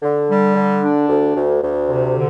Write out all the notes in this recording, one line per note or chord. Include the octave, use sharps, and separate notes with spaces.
D3
G3
D3
D4
D2
D2
D2
C3
D3